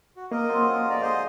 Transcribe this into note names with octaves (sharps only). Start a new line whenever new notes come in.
F#4
A#3 A#4 D#5
F#3 C4 F4
F3 C#4 G#4
D3 D5 A#5
D3 G#3 C5 D#5